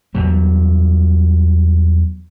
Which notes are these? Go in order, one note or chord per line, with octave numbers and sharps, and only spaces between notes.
E2 F#3 G3